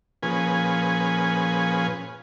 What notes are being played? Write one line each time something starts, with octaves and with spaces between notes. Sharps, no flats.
A#2 F3 C#4 G#4 B4 G#5